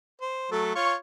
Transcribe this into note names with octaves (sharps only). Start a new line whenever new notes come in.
C5
F#3 A3 A4
F4 C#5 C#6